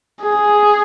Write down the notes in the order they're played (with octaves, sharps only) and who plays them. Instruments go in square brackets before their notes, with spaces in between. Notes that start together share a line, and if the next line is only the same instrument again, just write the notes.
[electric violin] G#4